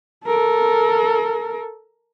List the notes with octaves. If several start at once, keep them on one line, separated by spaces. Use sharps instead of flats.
A4 A#4